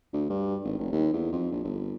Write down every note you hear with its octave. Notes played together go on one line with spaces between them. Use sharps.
D2
G2
G#1
F1
D#2
E2
F2
A#1
G1